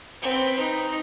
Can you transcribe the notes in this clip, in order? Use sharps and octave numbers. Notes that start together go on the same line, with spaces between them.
C4 B4
D#4